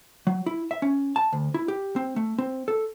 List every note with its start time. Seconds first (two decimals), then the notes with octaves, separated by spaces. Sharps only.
0.27 F#3
0.46 E4
0.71 E5
0.82 C#4
1.16 A5
1.33 D2
1.54 E4
1.68 G4
1.96 C4
2.16 A3
2.38 C4
2.68 A4